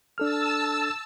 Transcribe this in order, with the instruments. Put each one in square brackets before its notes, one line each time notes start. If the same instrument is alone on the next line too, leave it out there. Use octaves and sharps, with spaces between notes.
[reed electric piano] D4 A4 F6 [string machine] A5 E6